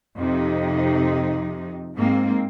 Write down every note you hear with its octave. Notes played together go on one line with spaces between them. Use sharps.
F2 C3 D#4
G#2 A#3 C4